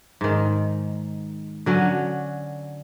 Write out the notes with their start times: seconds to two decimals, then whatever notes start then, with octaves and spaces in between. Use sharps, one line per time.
0.21 G#2 D#3
1.66 D3 F#3 C#4